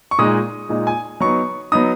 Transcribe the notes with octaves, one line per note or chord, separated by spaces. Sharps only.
C#6
A#2 G#3 D#4 D#6
A#2 G#3 D#4
G#5
F#3 B3 D#4 C#6
F#3 B3 D#4 D#6